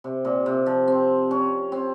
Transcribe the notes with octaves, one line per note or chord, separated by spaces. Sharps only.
C3
A#2
C3
F3
C4
C#4
C4